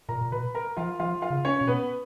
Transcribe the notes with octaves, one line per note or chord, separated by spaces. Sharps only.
A#2 A#4 A#5
A#2
B2 B4 B5
A#4 A#5
F3 F4 F5
F3 F4 F5
F4 F5
C#3
C#4 C#5
B2
B3 B4